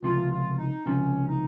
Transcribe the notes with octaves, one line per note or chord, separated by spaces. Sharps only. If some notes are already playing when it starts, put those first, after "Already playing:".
C#2 C3 F3 F4
F4
D#4
C#2 C3 F3 C#4
D#4